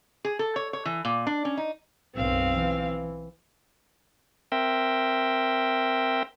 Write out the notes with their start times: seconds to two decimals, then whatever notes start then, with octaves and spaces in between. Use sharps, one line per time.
0.25 G#4
0.39 A4
0.56 C#5
0.73 C#5
0.85 E3
1.05 A#2
1.27 D4
1.45 C#4
1.57 D#4
2.15 B1 F#2 C4 F5
2.54 E3
4.52 C4 A#4 E5 G5